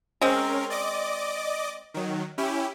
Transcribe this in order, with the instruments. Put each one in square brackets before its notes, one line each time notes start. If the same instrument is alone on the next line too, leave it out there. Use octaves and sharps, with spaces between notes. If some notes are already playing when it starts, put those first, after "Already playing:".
[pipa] G#3 C4 [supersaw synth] C#4 A#4
[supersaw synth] D5 D#5 D6
D#3 F#3
C#4 E4 G4